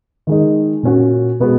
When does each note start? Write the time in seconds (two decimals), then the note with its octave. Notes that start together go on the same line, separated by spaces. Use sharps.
0.27 D#3 G#3 D#4
0.83 A#2 A#3 C#4 F#4
1.40 B2 G#3 B3 F#4